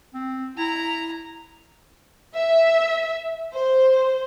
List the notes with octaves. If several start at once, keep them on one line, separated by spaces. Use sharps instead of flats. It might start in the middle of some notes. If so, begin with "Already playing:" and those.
C4
E4 A#5
E5
C5